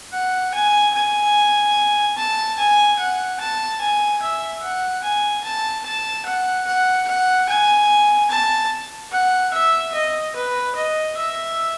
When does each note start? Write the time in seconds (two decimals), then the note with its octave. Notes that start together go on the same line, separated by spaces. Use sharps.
0.13 F#5
0.54 G#5
0.95 G#5
2.17 A5
2.59 G#5
2.99 F#5
3.40 A5
3.80 G#5
4.22 E5
4.62 F#5
5.03 G#5
5.44 A5
5.85 A5
6.26 F#5
6.66 F#5
7.07 F#5
7.49 G#5
8.30 A5
9.12 F#5
9.53 E5
9.94 D#5
10.35 B4
10.75 D#5
11.17 E5